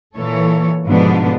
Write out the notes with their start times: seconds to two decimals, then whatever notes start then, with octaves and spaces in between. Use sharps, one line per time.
0.16 A#2 E3 A4 C#5
0.88 G#2 B2 D3 F3 B3 D4